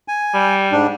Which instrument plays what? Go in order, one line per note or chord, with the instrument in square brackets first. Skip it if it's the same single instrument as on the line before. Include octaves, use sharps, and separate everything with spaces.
[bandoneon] G#5
[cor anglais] G3
[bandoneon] G#2 D4